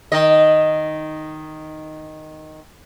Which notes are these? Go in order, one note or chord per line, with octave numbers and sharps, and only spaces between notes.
D#3 D#5